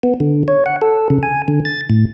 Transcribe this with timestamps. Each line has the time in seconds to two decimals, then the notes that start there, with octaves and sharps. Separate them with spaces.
0.03 B3
0.20 D3
0.48 C#5
0.66 F#5
0.82 A4
1.10 C#3
1.23 G#5
1.48 D3
1.65 A6
1.90 A2